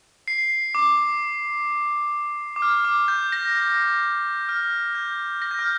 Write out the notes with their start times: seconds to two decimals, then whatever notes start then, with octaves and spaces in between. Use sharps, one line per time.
0.28 C7
0.75 D6
2.56 D6
2.62 F6
2.84 D6
3.08 G6
3.32 A#6
3.55 A#6
4.49 F6
4.95 G6
5.42 A#6
5.51 G6
5.59 F6